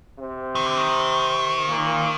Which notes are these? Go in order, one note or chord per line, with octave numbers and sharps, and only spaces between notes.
C3 C4
D#3
D3
D#3
A#2 A#3